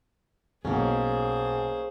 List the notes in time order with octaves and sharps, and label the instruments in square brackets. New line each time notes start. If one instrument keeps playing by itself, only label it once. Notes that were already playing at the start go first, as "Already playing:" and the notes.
[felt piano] B1 [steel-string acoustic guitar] A#3 C#4 [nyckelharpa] G#4 C5